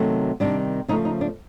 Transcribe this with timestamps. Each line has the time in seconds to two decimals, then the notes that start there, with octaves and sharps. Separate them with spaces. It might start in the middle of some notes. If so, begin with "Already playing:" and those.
Already playing: C3 D#3 F#3 A3
0.40 C3 D#3 G3 D4
0.88 C#3 F3 A3 D#4
1.05 D#4
1.21 D4